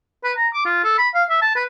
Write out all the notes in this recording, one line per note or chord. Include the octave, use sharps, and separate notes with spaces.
B4
A#5
D6
F4
A4
B5
F5
E5
A5
B4